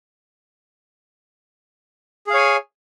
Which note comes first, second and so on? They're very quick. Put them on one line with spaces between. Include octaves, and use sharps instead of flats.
G#4 F5 C#5 G#5